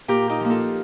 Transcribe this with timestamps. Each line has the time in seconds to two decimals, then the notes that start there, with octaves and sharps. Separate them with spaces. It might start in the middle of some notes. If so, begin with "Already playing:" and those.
0.08 A#2 G4 A#4
0.29 D#4 G4
0.40 F3 A#3
0.50 F4 A4